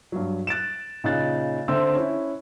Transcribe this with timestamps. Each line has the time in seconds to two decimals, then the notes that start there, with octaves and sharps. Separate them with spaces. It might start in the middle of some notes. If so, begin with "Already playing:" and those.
0.12 G2 F#3
0.47 F#6 A6 D7 E7
1.04 A#2 C#3 D#4 F5 F#6 A6
1.68 D3 C4 C5 E5 C6 E6
1.95 C#4 E4